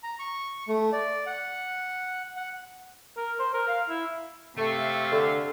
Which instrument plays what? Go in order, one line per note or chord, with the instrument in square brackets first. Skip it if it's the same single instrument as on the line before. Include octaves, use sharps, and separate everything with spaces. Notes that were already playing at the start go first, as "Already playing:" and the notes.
[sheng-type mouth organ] A#5
C#6
A3
D5
F#5
F#5
[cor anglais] A#4
C5
A#4
F5
E4
[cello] C3 F5 [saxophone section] A3
[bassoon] D3